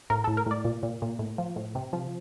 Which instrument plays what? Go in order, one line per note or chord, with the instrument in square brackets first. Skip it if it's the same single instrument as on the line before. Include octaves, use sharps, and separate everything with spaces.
[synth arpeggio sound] A2 A#4
A4
A2
A#4
A2 D5
A#2
A#2
A#2
A2
F3
A2
C3
F3